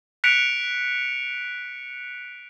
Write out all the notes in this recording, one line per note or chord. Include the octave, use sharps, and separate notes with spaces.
F#6 B6 C#7 D7 F7